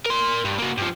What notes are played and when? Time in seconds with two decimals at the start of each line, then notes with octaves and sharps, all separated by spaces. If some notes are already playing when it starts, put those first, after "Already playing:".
0.06 A#4 C6
0.44 G2
0.58 A#3 F#4
0.77 G2 F3